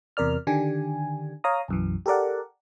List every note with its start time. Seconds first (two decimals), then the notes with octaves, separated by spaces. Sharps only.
0.17 E2 C3 A#4 D5 F6
0.47 D3 D#3 D4 G4 G#5
1.44 C#5 F5 A#5 D#6
1.68 B1 F#2 E3
2.06 G4 A4 A#4 D5 F#5